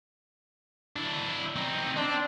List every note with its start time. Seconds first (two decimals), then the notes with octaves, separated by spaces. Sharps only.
0.96 D4 E4
1.56 C4 D#4
1.97 C4 D4